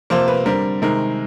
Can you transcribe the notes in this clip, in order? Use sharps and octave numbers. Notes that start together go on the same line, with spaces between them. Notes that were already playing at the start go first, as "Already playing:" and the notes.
C3 F3 A#3 C5
B4
D3 G3 C4 A#4
C3 D#3 G#3 A#4